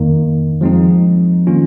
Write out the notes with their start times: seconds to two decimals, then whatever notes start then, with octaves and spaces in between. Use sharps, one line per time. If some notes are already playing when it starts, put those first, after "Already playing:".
Already playing: F2 D#3 A#3
0.61 F3 G#3 C4 D#4
1.47 D#3 A#3 C#4 F4